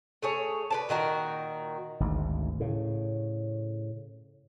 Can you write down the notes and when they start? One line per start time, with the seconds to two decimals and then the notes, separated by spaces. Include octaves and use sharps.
0.22 A3 G#4 C#5
0.70 B4 D5 A5
0.89 A#2 D#3 F#4 A#4
2.00 G#1 D2 G#2
2.60 A2 C#3